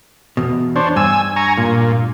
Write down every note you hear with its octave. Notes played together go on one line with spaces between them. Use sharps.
E2 B2
D4 C5 C#5
G2 G#5 E6
G#5 A#5 C#6
A#2